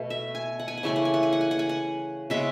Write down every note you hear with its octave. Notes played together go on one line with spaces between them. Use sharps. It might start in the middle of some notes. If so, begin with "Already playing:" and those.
Already playing: B2 A3
E5
G#5
F#5
G#5
F#5
C#3 E3 A3 G#5
F#5
G#5
F#5
G#5
F#5
G#5
F#5
G#5
F#5
C#3 G#3 B3 E5